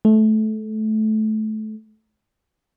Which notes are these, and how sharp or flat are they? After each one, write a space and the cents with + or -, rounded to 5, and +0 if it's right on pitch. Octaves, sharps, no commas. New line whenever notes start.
A3 -20